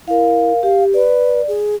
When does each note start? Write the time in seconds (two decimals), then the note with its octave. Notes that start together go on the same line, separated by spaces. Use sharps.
0.08 E4 A#4 F5
0.63 G4 F5
0.94 B4 D5
1.48 G#4